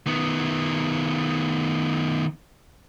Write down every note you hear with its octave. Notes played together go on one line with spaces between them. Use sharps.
D#3 B3